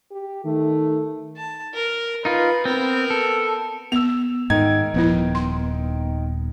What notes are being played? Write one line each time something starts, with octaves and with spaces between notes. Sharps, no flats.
G4
D#3 A3
A5
A#4
D#4 F4 B4
B3 C4 A#4
A4
B3 E6 F7
G#2 D#3 D#4 G#6
D#1 F3 B3 E4
C6